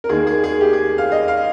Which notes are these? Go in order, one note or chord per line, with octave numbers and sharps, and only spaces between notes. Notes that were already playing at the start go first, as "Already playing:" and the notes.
A#4
D#2 D#3 A#3 G#4
G#4
G#4
G4
G#4
F5
D#5
F5